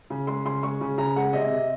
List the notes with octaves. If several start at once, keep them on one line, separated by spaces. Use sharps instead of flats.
C#3
G#3 C6
C#3 C6
G#3 C#6
C#3
C#3 A#5
G#3 F#5
C3 D#5
C3